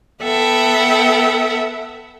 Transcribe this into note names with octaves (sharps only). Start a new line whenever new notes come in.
B3 A4 E5 F#5 G5